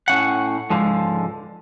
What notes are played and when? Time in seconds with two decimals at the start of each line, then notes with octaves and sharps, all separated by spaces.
0.08 A2 C#4 F#5
0.70 C#2 G#2 D3 F3 G#3